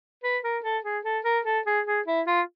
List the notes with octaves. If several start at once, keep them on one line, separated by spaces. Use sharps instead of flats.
B4
A#4
A4
G#4
A4
A#4
A4
G#4
G#4
E4
F4